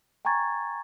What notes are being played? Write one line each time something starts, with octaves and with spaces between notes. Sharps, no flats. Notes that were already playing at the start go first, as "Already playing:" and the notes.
G5 G#5 A#5 C#6 G#6 A6